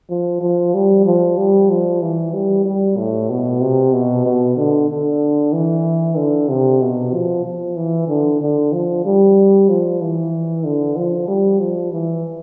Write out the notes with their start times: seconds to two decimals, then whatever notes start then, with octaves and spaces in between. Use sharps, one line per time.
0.09 F3
0.41 F3
0.74 G3
1.06 F3
1.38 G3
1.70 F3
2.02 E3
2.34 G3
2.65 G3
2.98 A2
3.29 B2
3.61 C3
3.93 B2
4.25 B2
4.57 D3
4.89 D3
5.53 E3
6.17 D3
6.49 C3
6.82 B2
7.13 F3
7.45 F3
7.76 E3
8.08 D3
8.41 D3
8.72 F3
9.05 G3
9.69 F3
10.01 E3
10.64 D3
10.96 F3
11.28 G3
11.60 F3
11.92 E3